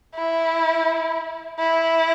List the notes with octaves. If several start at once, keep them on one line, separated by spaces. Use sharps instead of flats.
E4
E4